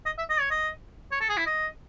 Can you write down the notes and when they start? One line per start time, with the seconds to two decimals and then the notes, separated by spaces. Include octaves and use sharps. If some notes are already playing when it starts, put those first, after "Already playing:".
0.06 D#5
0.18 E5
0.30 D#5
0.40 C#5
0.51 D#5
1.12 C#5
1.20 A4
1.29 G#4
1.37 E4
1.46 D#5